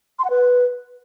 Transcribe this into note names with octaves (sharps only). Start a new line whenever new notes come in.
C6
F#5
B4